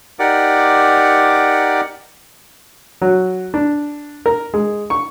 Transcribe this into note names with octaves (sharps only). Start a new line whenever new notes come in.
D#4 G4 A#4 D5 F#5 D6
F#3
D4
A#4
G#3
C#6